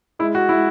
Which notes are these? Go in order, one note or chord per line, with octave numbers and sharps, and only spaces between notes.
G#3 E4
F#4
G#3 E4